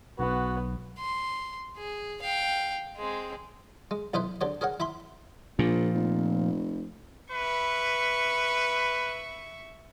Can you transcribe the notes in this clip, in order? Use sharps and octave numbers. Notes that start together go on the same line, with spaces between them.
B1 B3 F#4
C6
G#4
F5 G5
G#3 C4
G#3
B1 D#4 E4 B4 C5
D3 C4 G4 C#5
G#4 A#4 C#5 F#5
E4 E5 B5 C6
A#1 A#2 F3
F1
B4 E5 C#6